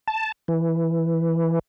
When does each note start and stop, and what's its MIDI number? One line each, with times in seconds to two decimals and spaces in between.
0.08 0.32 81
0.48 1.59 52